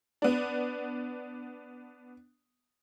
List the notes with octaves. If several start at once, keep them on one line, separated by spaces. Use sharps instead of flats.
B3 D4